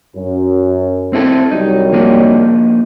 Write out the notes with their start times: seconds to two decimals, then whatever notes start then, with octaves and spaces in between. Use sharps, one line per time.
0.16 F#2
1.13 C4 E4 A4
1.51 C2 F#3 G3 D#4
1.92 F3 A#3 D#4